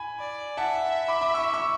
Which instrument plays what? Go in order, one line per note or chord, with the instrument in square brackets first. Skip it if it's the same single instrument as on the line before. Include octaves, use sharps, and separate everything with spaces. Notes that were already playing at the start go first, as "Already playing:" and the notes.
Already playing: [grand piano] G#5 B5
[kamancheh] D5
[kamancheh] E5 [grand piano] F#5 A5
[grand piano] B5 D6
B5 D6
C#6 E6
C#6 E6